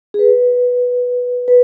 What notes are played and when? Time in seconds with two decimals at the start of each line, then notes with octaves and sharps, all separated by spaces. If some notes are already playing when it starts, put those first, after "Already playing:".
0.14 G#4
0.19 B4
1.48 B4